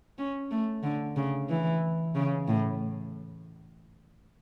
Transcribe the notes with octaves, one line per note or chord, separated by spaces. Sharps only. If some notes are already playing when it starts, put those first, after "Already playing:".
C#4
A3
D3
C#3
E3
C#3
A2